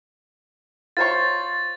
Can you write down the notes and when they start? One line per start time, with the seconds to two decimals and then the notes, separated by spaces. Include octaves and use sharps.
0.97 F4 C5 C#5 A6